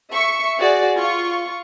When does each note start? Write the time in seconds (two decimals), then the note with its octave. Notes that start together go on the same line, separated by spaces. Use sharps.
0.11 E5 C#6
0.58 F#4 G#4 D5
0.98 F4 C#6